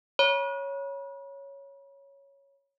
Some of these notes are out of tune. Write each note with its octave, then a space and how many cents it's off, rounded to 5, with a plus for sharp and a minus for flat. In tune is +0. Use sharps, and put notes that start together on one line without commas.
C#5 +0 B5 -45